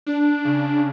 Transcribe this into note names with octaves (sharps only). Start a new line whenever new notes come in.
D4
C#3